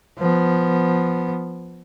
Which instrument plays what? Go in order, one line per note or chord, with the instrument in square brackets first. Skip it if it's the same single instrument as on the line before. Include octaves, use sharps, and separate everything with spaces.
[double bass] F3 B3